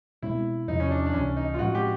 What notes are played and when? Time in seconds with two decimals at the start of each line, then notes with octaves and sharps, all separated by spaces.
0.22 B2 G#3 C4 E4
0.68 E2 C3 F3 D#4
0.80 C#4
0.91 D4
1.06 D4
1.14 C#2 C3 E3 C#4
1.36 D#4
1.54 F4
1.59 A2 F3 G#3 C4 F#4
1.75 G4